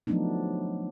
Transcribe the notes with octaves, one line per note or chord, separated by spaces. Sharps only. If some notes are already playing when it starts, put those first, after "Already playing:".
F3 F#3 A3 B3 D4 D#4